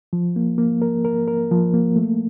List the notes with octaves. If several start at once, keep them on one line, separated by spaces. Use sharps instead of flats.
F3
A#3
A#3
A#4
A#4
A#4
F3
A#3
A3